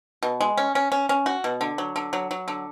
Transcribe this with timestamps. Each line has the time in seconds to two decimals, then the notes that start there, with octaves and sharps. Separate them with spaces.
0.23 B2
0.41 G#3
0.57 C#4
0.75 C#4
0.92 C#4
1.09 C#4
1.26 F#4
1.44 B2
1.61 D3
1.78 F#3
1.96 D3
2.13 F#3
2.31 F#3
2.48 D3